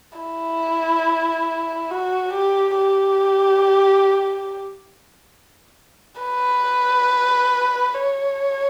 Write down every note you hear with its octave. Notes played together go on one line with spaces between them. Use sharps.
E4
F#4
G4
G4
B4
C#5